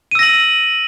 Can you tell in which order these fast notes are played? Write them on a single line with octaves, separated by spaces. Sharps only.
D#7 E6 A#6 F#7